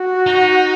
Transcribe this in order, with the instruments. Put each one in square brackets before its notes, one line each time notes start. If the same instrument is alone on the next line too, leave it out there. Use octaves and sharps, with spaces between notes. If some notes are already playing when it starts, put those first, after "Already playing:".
Already playing: [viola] F#4
[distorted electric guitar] D#4